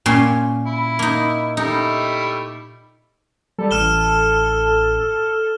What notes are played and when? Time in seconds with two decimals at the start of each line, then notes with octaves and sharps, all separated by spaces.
0.06 A#2 C#4 C6
0.66 E4
0.99 A#3 D#4
1.57 G3 A3 D#4 E4
3.59 G3 A4
3.71 A1 F6 E7 G7